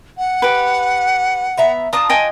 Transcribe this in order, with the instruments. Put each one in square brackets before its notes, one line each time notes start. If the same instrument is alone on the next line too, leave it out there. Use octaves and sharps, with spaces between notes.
[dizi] F#5
[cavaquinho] G4 B4
[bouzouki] B3 E5 A#5
[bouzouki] D4 F4 A5 [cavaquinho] A#5 D#6
[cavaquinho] D#5 G5 G#5